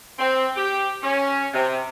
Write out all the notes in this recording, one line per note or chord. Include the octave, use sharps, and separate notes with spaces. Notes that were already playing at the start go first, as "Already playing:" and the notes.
C4
G4
C#4
C3